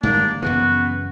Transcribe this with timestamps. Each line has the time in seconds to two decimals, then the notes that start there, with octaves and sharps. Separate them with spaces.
0.03 G#2 D#3 G3 A#3 D4
0.42 F#2 C#3 E3 B3 F#4